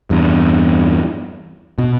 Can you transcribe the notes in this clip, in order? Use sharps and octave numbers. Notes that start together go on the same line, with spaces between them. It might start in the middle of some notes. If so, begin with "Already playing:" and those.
E2 G2
B2